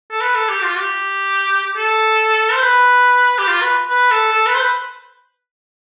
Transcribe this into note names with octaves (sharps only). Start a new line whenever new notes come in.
A4
B4
A4
G4
F4
G4
A4
C5
B4
G4
F4
B4
B4
A4
A4
B4
C5
B4